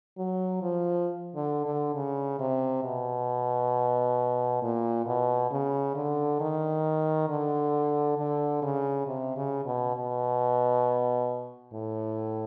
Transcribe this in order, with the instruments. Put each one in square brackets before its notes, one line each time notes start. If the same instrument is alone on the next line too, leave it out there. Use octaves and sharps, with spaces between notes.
[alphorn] F#3
F3
D3
D3
C#3
C3
B2
A#2
B2
C#3
D3
D#3
D3
D3
C#3
C3
C#3
B2
B2
A2